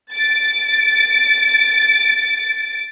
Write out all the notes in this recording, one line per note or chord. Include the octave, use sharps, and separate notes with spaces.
A6 D7